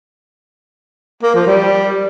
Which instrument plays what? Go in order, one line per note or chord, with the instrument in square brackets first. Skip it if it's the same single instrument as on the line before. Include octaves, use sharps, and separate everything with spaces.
[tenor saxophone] A#3
F3
G3